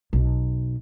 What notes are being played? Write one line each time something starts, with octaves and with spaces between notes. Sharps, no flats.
B1